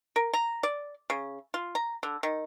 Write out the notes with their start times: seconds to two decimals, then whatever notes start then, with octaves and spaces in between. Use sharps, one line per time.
0.16 A#4
0.34 A#5
0.63 D5
1.10 C#3
1.54 F4
1.75 A#5
2.03 D3
2.23 D#3